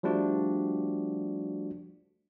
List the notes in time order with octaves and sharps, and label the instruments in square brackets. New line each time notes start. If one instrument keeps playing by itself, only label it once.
[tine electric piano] F3 G3 A3 D4 F#4